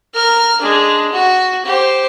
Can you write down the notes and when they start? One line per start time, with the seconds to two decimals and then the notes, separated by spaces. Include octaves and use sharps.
0.14 A#4 F6
0.61 G#3 D4
1.13 F#4
1.65 G4 C5